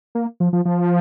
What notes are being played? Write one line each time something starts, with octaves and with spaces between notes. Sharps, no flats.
A#3
F3
F3
F3